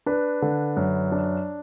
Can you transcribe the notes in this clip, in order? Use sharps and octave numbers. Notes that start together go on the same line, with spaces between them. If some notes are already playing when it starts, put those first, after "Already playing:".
D4 B4
D3
F#2
D4